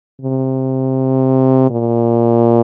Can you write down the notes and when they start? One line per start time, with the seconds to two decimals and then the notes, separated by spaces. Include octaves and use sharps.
0.22 C3
1.70 A#2